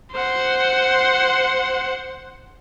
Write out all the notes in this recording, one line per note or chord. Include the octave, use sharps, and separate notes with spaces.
C5 F#5